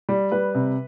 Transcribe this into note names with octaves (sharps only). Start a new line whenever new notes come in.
G3
G3 B4
C3